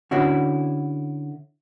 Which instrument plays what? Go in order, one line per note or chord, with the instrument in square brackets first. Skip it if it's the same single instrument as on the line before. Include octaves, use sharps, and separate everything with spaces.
[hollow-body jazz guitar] D3 C#4 E4 F#4